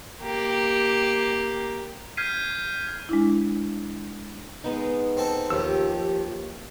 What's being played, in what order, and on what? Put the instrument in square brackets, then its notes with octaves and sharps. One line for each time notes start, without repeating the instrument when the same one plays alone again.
[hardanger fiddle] A#3 G4
[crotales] F6 G6 G#6 B6 C7 D#7
[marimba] G#3 D4 E4
[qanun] G#3 B3 D#4
[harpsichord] C4 A4
[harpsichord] D#2 [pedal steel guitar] F3 G4 E6